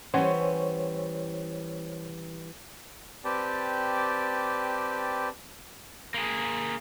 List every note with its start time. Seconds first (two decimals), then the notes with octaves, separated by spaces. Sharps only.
0.14 E3 G3 C#4 C5 C#5 F#5 G#5
3.25 C4 G4 B4 D5 G5 A5
6.14 A#3 G#4